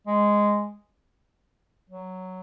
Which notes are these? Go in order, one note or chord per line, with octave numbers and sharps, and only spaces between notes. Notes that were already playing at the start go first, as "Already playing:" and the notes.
G#3
F#3